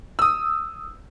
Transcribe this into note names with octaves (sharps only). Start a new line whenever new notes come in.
D#6 E6